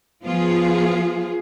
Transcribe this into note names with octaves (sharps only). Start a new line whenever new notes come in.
F3 B3 F4 G#4